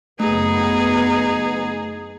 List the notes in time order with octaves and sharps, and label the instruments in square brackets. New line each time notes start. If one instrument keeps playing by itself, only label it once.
[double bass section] F#1 B3 [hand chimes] A3 [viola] D#4 [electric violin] G#4